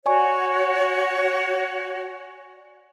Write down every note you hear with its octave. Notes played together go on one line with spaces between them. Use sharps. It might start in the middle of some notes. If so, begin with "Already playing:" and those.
F#4 C#5 D5 G#5 C#6